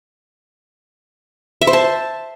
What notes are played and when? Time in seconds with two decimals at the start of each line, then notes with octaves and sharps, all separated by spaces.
1.61 E5
1.67 C5
1.73 A5